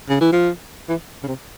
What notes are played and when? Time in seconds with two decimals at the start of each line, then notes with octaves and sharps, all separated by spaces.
0.09 C#3
0.21 E3
0.32 F3
0.89 E3
1.23 C#3
1.28 C3